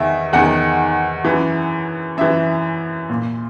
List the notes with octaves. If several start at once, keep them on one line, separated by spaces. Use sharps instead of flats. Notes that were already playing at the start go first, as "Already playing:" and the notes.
Already playing: E2 D#3 E5
E2 D#3 F#5
F#2 E3
F#2 E3 E5
A#2